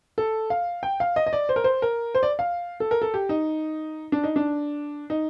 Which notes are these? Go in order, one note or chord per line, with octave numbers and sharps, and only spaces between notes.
A4
F5
G5
F5
D#5
D#5
D5
C5
A#4
C5
A#4
C5
D5
F5
A4
A#4
A4
G4
D#4
D4
D#4
D4
D#4